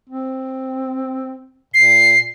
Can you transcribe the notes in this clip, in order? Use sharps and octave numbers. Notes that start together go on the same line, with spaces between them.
C4
A#2 C7